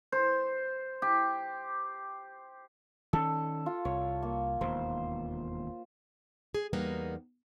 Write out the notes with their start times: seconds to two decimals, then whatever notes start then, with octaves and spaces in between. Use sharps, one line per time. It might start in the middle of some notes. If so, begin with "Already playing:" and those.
0.12 C5
1.02 G4
3.13 D#3 C#4 A4
3.66 F4
3.85 C2 C#5
4.22 A#3
4.61 E1 D#2 C5
6.54 G#4
6.73 E2 G3 A#3 B3 D#4